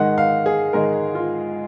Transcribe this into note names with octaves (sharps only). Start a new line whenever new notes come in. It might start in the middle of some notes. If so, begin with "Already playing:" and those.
Already playing: G#2 D#3 G#3 F#5
F5
G#4
G#2 D#3 G#3 A#4
F4